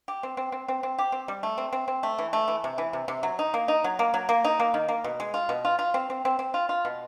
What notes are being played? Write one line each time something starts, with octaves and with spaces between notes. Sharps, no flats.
G4
C4
C4
C4
C4
C4
G4
C4
G3
A3
C4
C4
C4
A3
E3
A3
E3
C3
E3
C3
C3
F#3
D#4
A#3
D#4
F#3
A#3
F#3
A#3
D#4
A#3
D#3
A#3
B2
G#3
F4
B2
F4
F4
C4
C4
C4
C4
F4
F4
B2